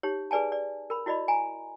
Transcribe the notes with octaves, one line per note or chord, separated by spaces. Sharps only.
D#4 G4 C#5
G#4 B4 D5 G#5 A5
D5
A#4 B5
E4 F#4 D5 D#5 B5
G#5 A#5